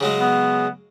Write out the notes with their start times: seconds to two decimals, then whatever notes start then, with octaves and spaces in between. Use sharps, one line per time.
0.01 C#3 F#3 G#3
0.18 B3